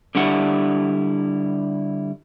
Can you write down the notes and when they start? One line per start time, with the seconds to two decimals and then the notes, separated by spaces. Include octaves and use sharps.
0.15 D3 G3 D4 E4 F#5